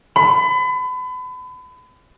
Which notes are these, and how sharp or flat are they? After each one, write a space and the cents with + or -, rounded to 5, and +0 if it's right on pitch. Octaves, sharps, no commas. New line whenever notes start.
B5 +35